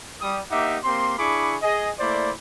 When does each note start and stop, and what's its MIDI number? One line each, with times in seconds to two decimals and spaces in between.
0.21 0.40 55
0.21 0.40 87
0.51 0.79 58
0.51 0.79 63
0.51 0.79 67
0.51 0.79 76
0.51 0.79 78
0.51 0.79 86
0.84 1.16 58
0.84 1.16 60
0.84 1.16 67
0.84 1.16 84
1.18 1.56 62
1.18 1.56 64
1.18 1.56 68
1.18 1.56 83
1.18 1.56 85
1.18 1.56 86
1.62 1.90 68
1.62 1.90 75
2.00 2.31 57
2.00 2.31 58
2.00 2.31 64
2.00 2.31 72
2.00 2.31 74